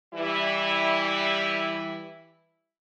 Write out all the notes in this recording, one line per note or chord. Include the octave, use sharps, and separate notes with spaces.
E3 G3 E4